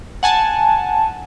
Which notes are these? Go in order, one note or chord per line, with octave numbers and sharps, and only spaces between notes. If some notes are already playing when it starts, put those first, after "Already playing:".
F#5 G#5 A5